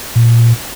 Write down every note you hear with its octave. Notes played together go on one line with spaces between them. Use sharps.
A#2